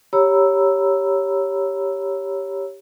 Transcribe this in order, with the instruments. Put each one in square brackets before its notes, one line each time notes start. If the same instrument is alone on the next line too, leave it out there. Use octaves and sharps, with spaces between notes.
[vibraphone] G4 C#5 A#5 B5 E6